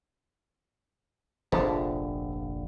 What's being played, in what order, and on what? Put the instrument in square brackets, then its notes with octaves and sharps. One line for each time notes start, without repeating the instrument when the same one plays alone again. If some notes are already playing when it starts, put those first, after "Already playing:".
[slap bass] F1 A#1 D4 [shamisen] F3 G#3 A3